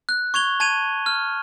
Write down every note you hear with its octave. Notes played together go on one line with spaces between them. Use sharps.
F#6
C#6 G#6 F7 G7
A5 G#6 D#7 F7
F6